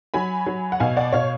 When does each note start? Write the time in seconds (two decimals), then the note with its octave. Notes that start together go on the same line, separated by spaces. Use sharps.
0.14 F#3 G#5 B5
0.46 F#3
0.72 F#5
0.80 B2 F5 G#5
0.97 D5 F#5
1.12 B2 C#5 F5